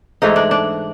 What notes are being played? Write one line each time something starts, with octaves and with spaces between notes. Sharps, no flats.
G#2 E3 A3 D#4
D4
D4